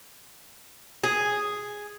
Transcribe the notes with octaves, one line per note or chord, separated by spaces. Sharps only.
G#4